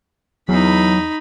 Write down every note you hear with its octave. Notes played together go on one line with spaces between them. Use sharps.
E2 F#3 D#4 B5